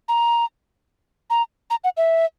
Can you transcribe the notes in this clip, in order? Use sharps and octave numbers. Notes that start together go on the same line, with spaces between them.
A#5
A#5
A#5
F#5
E5